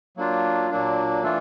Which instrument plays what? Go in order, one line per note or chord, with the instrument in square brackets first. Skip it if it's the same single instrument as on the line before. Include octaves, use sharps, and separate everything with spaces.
[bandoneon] F#3 A#3 D4 F4
A#2 F#3 A#3 D4
E3 A3 D4 F4 A4